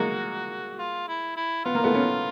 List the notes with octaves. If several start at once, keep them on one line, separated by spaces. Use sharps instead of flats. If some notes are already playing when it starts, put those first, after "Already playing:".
Already playing: G#3 A#3 F#4
F4
E4
E4
B3 F4
A#3
A3 B3
B3 C#4